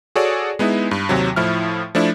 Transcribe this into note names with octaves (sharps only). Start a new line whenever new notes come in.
F#4 G#4 A4 C#5 D5
G#3 B3 D#4 E4
G2
D#2 C3 F#3
A2 F3 E4 F6
F3 A3 D4 E4